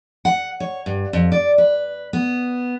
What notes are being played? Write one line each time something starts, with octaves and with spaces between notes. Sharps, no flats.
F#5
C#5
G2
F2
D5
B4
B3